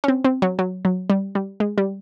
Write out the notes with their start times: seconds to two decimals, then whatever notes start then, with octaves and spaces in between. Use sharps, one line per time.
0.04 C#4
0.08 C4
0.25 C4
0.42 F#3
0.59 F#3
0.85 F#3
1.10 G3
1.35 G3
1.60 G#3
1.78 G3